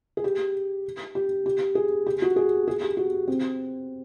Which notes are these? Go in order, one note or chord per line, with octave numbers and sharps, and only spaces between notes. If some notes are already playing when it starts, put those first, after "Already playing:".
G#4
G4
G4
G4
G#4
G4
F#4
G#4
G#4
G4
F#4
C4